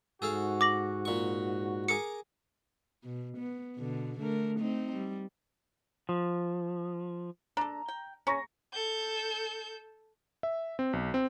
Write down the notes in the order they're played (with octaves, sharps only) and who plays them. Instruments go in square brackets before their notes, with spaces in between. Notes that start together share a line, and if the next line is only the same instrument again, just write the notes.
[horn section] G#2 F#4 [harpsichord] G#4 A4 F5
[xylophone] D6 A#6 F#7
[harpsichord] A#2 C#6
[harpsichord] G#4 A#4 D6 [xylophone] C#7
[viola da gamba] B2
B3
B2 D3
D3 A3 A#4
A3 C4 D#4
G3
[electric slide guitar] F3
[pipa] D4 A4 [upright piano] A#5
[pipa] G5
[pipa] C#4 [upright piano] A#5 C#6 A#6
[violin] A4 G6
[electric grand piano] E5
C4
B1
C4